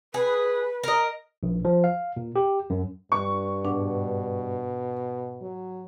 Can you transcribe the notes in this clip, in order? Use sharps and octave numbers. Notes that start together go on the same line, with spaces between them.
G#4 B4
A#4 D#5
A#1
F3
F5
A#2
G4
F#2
G2 C#6
G#2 B2 D4 F#5
F#3